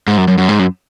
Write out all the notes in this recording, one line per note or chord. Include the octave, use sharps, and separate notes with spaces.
G#2
F#2
F#2
F#2
G#2
F#2